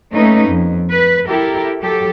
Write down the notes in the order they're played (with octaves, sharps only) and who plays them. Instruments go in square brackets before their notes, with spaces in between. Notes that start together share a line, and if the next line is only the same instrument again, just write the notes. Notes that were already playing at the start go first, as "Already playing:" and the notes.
[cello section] A3 A#3 C#4 D#4 B4
F2
B4
E4 G4 A4 A#4
F#3 G4 A4